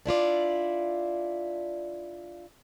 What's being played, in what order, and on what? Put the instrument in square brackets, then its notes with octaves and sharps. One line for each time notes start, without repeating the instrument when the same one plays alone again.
[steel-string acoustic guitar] D4 E4 F4 D5